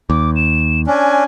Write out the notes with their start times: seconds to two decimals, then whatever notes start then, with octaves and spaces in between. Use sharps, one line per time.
0.10 D#2 D6
0.36 E7
0.87 C#4 D4 G#5